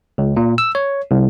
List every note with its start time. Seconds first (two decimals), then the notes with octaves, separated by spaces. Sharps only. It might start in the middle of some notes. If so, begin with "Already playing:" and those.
0.18 C#2
0.36 A#2
0.58 E6
0.75 C#5
1.11 C2